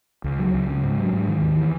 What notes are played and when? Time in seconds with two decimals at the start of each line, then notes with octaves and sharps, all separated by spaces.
0.24 C#2
0.39 F#3
0.54 C#2
0.69 C#3
0.83 G#2
0.98 F#3
1.13 G#2
1.28 D#3
1.42 D#2
1.56 E3